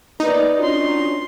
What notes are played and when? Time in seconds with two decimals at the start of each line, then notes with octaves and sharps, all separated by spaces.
0.20 C#2 A#3 B3 D#4 B4 D5
0.59 C#4 D4 F4 F#4 C6